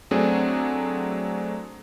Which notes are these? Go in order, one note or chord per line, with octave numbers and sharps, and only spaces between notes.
F#3 A3 C4 D4 G#4